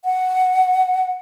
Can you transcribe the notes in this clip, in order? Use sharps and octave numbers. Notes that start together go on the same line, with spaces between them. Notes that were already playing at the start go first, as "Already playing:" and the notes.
F#5